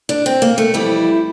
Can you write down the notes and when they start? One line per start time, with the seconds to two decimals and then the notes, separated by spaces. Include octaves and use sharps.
0.09 D4
0.26 C4
0.42 A#3
0.58 A3
0.74 F2 E3 G3 E4